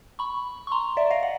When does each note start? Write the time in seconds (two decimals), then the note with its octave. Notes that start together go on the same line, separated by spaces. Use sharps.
0.19 B5 C#6
0.67 C#6
0.72 A#5 C6
0.97 D5 E5
1.10 D#5 F5
1.23 F#5